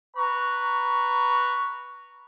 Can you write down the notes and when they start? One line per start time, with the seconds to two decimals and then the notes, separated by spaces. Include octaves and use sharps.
0.17 B4 A#5 C#6